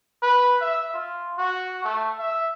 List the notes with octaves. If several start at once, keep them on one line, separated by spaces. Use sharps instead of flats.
B4
E5
F4
F#4
A3
E5